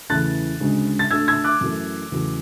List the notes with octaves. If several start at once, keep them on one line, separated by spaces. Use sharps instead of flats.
E2 C#3 E3 A3 F#6 A6
D2 C#3 G#3
A6
D2 D3 A3 E6 G#6
E6 G#6
D6 F#6
F#2 E3 A3
E2 C#3 F#3 A3